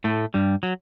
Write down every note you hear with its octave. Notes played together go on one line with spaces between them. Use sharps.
A2 A3
G2 G3
F#3